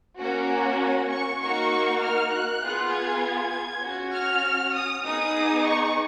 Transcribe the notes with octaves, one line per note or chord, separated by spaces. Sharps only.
A#3 C#4 F#4
G#5
C#6
A#3 D#4 F#4 C#6
F6
F#6
B3 F4 G#4
G#6
C#4 F#4
F6
D#6
B3 D#4 G#4 D#6
C#6